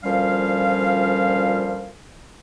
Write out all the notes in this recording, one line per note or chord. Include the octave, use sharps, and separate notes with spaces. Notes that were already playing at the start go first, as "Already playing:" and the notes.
D2 A#2 F3 G3 C#4 F5